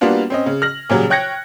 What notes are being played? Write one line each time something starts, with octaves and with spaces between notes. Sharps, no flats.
G3 A#3 B3 D4 F4 F#4
C4 C#4 D#5
C#3
F6 A#6 F#7
A#2 C#3 F#3 G3
C#5 G5 F#6 G#6 A#6 C#7